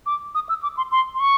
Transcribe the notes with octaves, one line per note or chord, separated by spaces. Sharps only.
D6
D#6
E6
D6
C6
C6
C6
C#6